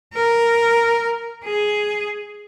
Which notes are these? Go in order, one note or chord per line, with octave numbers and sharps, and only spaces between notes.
A#4
G#4